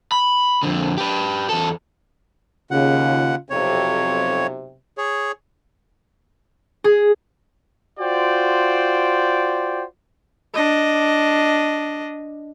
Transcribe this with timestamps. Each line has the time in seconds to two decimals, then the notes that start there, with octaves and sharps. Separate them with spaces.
0.12 B5
0.63 F2 D3
0.98 G4 B4
1.49 E2 A4
2.71 D#2 C#3 F4 F#5
3.50 B1 F2 C3 C#5
4.98 G#4 C#5
6.84 G#4
8.00 F4 F#4 C5 D5 G5
10.54 D4 D#5